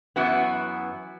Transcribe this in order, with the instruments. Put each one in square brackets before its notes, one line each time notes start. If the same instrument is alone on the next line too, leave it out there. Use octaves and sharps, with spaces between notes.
[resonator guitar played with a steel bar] F#2 E3 B3 F#4